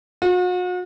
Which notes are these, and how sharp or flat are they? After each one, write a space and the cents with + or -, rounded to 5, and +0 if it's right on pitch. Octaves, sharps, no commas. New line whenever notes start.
F#4 -40